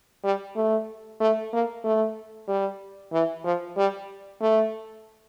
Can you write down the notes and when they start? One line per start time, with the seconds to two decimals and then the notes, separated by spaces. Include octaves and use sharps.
0.24 G3
0.56 A3
1.20 A3
1.53 A#3
1.84 A3
2.48 G3
3.13 E3
3.45 F3
3.77 G3
4.42 A3